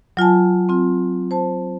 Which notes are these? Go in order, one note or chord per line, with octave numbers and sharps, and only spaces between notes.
F#3 F4 G#5 A5
C4 F4
C5 A5